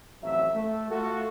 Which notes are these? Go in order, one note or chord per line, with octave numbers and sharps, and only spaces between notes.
A1 F2 F#3 E5
A3
A3 F4 F#4 A4